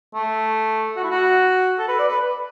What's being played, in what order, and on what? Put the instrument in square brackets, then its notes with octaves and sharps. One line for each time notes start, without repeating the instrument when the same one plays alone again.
[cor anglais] A3
F#4
E4
F#4
A4
B4
D5
B4